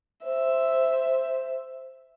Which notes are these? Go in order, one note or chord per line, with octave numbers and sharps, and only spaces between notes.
C5 E5